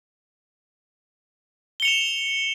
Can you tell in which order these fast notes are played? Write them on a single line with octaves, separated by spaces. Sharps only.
G7 C#7 F7 E7